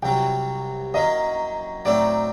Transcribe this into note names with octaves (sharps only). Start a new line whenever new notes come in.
C2 C3 F#3 G5
F#2 F#3 A#3 D#5
A2 F#3 A3 C4 D#4 D5